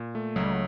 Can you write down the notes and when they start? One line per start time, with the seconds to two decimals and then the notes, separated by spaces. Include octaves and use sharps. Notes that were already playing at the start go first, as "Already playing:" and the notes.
Already playing: A#2
0.15 A3
0.36 C#2 F#3
0.44 G3
0.51 F#3